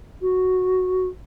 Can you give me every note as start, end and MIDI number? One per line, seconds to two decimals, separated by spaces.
0.21 1.08 66